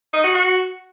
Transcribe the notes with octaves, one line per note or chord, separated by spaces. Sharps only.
D#4
F#4
F#4